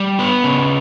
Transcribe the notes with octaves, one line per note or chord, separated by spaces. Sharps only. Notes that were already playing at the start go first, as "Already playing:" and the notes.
Already playing: G3
B3 B4
C#3